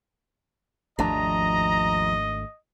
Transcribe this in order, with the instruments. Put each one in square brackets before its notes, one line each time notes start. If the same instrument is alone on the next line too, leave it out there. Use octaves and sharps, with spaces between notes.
[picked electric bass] G#1 A3 D4 [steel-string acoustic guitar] D#2 F3 [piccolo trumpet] D#5 [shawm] A#5